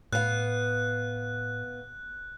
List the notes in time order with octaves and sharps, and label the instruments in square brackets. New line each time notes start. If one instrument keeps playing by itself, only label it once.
[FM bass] A2 [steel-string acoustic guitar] B3 F5 [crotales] F#6